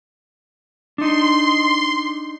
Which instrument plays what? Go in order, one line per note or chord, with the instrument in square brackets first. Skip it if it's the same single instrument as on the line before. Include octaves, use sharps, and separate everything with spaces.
[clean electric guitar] D4 D#4 [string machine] C6